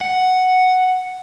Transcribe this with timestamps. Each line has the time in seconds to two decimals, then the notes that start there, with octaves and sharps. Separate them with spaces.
0.01 F#5